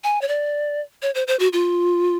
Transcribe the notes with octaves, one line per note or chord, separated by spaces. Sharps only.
G#5
C#5
D5
C#5
C5
C5
F#4
F4